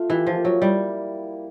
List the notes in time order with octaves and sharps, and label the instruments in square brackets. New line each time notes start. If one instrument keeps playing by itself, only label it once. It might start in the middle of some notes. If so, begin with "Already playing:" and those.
Already playing: [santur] A3 F4
[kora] E3 [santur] G4
[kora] F3
[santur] A#3
[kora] F#3
[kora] G3 [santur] E4